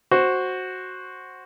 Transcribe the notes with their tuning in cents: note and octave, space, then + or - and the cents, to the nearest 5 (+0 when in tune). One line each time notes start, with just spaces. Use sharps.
F#4 +0 C5 +10